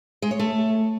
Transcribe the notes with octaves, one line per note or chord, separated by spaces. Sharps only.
G#3
C#5
A3